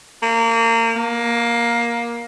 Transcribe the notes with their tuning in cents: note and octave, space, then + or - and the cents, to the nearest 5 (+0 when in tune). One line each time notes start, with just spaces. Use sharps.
A#3 -30
A#3 +15